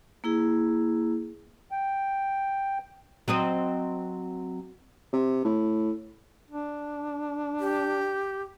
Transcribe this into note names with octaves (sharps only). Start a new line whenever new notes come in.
A#3 E4 G#4
G5
F#3 C4 D#5
C3
A2
D4
G4